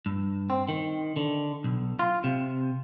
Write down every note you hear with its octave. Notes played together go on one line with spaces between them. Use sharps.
G2
C4
D#3
D3
B1
F4
C3